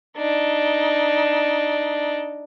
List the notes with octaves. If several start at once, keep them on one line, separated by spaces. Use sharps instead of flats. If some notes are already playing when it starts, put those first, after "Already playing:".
D4 D#4